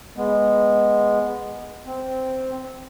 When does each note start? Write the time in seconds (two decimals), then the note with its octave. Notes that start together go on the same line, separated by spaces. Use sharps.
0.16 G#3 B3
1.86 C4